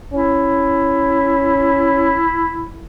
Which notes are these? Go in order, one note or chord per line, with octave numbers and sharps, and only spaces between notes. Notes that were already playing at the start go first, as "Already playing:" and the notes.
C#4 E4